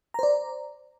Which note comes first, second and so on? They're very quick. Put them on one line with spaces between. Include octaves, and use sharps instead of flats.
A#5 C5 D5